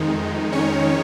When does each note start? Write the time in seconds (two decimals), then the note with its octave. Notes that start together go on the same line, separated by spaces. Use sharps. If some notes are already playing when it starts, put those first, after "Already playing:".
Already playing: F2 D#3 G#3 D#4
0.52 C#4 C#5